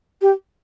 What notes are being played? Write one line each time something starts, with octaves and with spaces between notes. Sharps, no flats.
G4